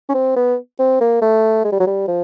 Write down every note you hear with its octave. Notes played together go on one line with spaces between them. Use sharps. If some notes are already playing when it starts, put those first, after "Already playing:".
C#4
C4
B3
C4
A#3
A3
G#3
G3
F#3
G3
F3